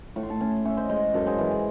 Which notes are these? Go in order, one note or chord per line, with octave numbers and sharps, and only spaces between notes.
A2 C#6
C6
A5 C#6
C#4 G#5 C6
C#4 C#5 E5
C5 D#5
G#3 C5 D#5
F#2 A4 C#5
G#4 C5
E3
G#4